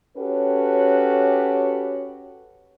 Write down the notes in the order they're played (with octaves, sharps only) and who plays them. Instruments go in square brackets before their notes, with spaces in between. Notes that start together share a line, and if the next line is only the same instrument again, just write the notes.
[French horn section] C#4 F#4 G4 A4 B4 C#5